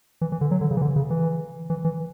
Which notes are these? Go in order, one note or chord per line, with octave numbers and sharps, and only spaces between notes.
E3
E3
D3
F#3
D3
C#3
E3
D3
C#3
E3
E3
E3